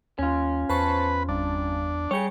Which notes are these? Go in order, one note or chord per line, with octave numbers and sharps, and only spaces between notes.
D#2 C#4 F4
E2 B4 C5 A5 C#6
G1 D4
G3 G#4 C#5 G5 C#7